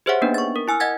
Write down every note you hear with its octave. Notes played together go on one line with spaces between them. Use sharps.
G4 G#4 C5 C#5 E5 F#5
A#3 B3 D4 D#4 B4
C#6 A6
A#4
E4 G#5 E6 F6
D#5 F#5 G#6 A6